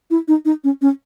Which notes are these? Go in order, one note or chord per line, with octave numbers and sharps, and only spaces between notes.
E4
D#4
D#4
C#4
C#4